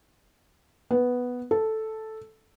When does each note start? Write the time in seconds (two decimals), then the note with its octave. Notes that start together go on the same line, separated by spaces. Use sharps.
0.91 B3
1.51 A4